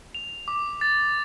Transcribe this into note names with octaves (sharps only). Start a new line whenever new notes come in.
F7
D6
A6